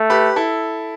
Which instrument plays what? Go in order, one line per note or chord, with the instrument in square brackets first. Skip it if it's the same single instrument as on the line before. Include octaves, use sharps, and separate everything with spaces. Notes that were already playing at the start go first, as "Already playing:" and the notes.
Already playing: [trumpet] A3
[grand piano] G4 B4
E4 A4